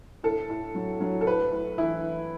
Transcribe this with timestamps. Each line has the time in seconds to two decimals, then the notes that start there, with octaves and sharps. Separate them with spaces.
0.23 A2 A4
0.50 A2
0.75 F#3
1.01 F#3
1.21 A4
1.27 A2 B4
1.52 A2
1.78 E3 E4